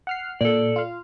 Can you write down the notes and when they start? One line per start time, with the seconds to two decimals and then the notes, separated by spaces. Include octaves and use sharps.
0.07 F#5 F6 C7
0.41 A#2 A4 D5
0.76 F4 F5